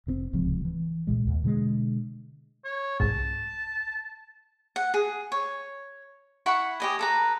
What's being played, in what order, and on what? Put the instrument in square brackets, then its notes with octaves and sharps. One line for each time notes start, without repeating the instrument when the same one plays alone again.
[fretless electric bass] F1 C3 C4
D1 C#2 C3 F3
E3
C2 A#2 G#3
D#2
B2 D3 G3 G#3
[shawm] C#5
[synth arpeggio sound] C2 G#2 [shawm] A5
[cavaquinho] F#5
G#4
C#5
E4 F#5 B5 C#6
G4 D#5 G#5
A4 B4 A#5